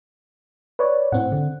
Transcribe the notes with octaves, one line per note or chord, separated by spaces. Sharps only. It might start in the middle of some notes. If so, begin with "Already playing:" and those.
B4 C#5 D5
A2 C4 F#5
D3